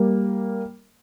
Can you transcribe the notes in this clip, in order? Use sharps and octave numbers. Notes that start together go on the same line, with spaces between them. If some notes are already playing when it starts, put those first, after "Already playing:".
Already playing: G3 A#3